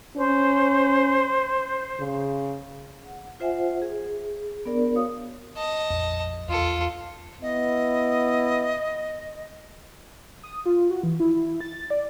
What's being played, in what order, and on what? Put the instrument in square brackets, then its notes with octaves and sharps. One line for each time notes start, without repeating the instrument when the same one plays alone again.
[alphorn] C#4 [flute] C5
[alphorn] C#3
[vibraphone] F#5
F4 C5 E5 F#5 G#5
G#4
B3 D4 A#4 D5
F#4 C#5 F5 D#6
[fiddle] D#5 A5
[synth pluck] A#1 F2
[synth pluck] E2 [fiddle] F4 A4
[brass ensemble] B3 E4 [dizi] D#5
[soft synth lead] D#6
F4
F#4
E3
E4
A6
D5